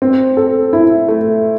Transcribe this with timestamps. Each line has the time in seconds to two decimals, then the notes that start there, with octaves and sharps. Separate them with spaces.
0.02 C4
0.37 A4
0.73 E4
1.08 A3